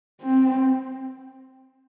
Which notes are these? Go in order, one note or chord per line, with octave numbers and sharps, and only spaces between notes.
C4